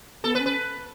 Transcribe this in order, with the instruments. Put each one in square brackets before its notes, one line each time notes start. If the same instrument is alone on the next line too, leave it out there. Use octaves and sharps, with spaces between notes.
[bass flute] B3 [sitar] A4
[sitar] B4
[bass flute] C#4
[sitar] B4